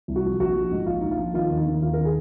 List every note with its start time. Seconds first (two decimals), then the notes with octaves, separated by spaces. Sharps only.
0.08 C2
0.16 F#4
0.24 F3
0.40 A#1 F#4
0.55 F3
0.71 G#2
0.86 A#1 F4
1.01 A#1 D#4
1.11 F4
1.18 F3
1.34 D#3 F4
1.49 D#2
1.57 D#4
1.66 D#3
1.82 D#2 F4
1.93 D#3 A#4
2.05 G#4